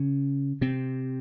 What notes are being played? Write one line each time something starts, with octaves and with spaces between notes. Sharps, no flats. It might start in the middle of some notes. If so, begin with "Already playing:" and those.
Already playing: C#3 C#4
C3 C4